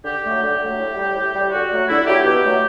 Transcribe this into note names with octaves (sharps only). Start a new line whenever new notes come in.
D3 G4
F#3 A3
D3 G4
F#3 A3
A2
G3
A2
G3
D3 F#4
F#3 A3
D3 E4
F#3 A3 G4
B2 G4
F#3 A3